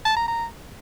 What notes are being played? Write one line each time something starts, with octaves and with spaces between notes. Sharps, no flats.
A5
A#5
A#5